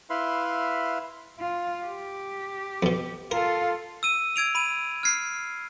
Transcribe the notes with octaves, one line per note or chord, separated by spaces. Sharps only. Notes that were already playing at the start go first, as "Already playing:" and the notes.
E4 B4 E5 F5 B5 C6
F4
G4
F2 B2
F4 A4 A#4
E6 D#7
E6 G#6 D7 F7
B5 D#7
F6 G#6 C7